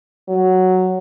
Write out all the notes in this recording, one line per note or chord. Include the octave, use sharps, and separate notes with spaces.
F#3